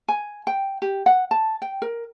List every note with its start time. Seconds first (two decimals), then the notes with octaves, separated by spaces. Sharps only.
0.08 G#5
0.47 G5
0.82 G4
1.06 F#5
1.31 A5
1.62 G5
1.82 A#4